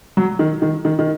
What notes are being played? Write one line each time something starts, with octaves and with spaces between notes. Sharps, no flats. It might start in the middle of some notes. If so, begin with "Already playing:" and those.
F#3
D#3
D#3
D#3
D#3